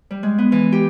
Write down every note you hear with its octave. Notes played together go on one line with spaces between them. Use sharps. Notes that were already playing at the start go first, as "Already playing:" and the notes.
G3
G#3
B3
E3
G4